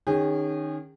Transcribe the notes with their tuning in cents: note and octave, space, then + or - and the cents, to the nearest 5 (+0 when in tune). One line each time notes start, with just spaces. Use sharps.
D#3 -15 C#4 +0 G#4 -35